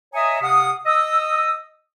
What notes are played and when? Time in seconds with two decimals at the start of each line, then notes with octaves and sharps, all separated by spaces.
0.14 C#5 D#5 E5 G#5 A#5 D#6
0.42 C3 F5 F#5 D#6
0.86 D#5 D#6 E6